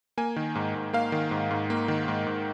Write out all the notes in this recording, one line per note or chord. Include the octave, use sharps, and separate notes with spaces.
A#3 G#5
D#3
G#2
G#2
A#3 F5
D#3
G#2
G#2
A#3
D#3
G#2
G#2